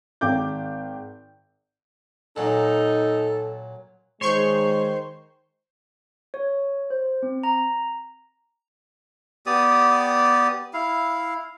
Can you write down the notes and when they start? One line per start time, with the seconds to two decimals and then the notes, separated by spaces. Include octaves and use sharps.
0.21 G#1 G5 D6 G6
2.36 A#2 F#3 D#4 A4
4.21 D#3 G#3 C5 C#5 C6 C#6 G6
6.34 C#5
6.90 C5
7.23 C4
7.43 A#5
9.46 B3 G4 D5 D#6
10.74 E4 F5